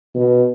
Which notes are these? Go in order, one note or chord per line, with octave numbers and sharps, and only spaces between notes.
B2